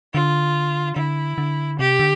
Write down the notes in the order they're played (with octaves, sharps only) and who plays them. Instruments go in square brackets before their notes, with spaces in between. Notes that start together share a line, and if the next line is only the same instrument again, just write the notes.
[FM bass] D3 [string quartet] F4
[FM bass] D3 [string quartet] E4
[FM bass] D3
[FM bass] C3 [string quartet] G4
[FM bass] D3